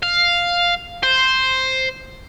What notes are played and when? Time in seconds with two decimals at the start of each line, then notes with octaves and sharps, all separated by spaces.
0.03 F5
1.03 C5